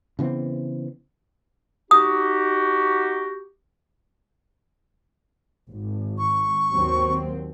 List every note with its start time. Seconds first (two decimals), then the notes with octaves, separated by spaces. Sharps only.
0.19 C#3 E3 B3 C4
1.91 D#4 F#4 G4 D#6
5.68 G#1
6.18 C#6
6.72 D#2 F#3 C4